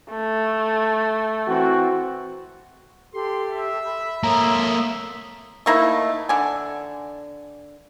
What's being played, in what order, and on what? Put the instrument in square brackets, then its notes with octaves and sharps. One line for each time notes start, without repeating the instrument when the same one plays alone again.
[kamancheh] A3
[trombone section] E3 C4 F#4
[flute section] G4 A4 [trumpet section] C6
[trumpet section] E5
[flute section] B5
[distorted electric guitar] A#3 A4 [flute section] C#5 C6 D#6 [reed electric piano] A#5
[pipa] A3 A#3 D#4 E4
D3 G#5